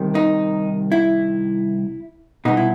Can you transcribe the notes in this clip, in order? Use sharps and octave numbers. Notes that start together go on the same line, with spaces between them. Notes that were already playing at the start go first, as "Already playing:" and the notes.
Already playing: C2 C3 D#3
D#4
E4
C2 B2 D#4
E4